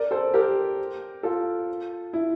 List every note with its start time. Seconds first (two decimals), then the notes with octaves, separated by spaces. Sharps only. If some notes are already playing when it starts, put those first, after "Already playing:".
Already playing: A#4 D5
0.11 A4 C5
0.34 G4 A#4
1.23 F4 A4
2.13 E4